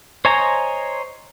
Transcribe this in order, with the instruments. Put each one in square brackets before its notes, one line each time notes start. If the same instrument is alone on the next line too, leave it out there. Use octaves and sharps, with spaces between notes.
[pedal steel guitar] C5 C#5 D#5 G#5 A#5